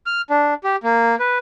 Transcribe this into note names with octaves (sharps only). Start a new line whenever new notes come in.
F6
D4
G4
A#3
B4